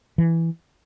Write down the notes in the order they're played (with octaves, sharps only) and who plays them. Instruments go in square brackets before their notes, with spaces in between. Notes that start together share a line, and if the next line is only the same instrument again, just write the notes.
[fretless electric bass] E3